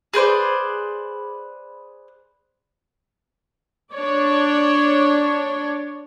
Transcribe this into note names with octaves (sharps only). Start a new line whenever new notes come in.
G#4 B4 C5 D5
D4 C#5 D5